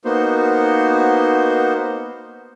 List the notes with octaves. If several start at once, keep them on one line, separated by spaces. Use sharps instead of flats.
A#3 B3 D#4 F#4 C5